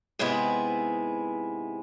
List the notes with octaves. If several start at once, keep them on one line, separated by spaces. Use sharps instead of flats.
G#2 C3 B3 E4 G#4 B4